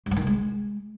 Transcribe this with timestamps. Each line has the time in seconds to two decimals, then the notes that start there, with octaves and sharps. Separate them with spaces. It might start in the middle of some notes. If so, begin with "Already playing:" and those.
0.06 G2
0.11 F#3
0.16 D#3
0.22 C3
0.27 G#3